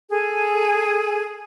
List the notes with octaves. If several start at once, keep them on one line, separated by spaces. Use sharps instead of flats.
G#4 A4 G#5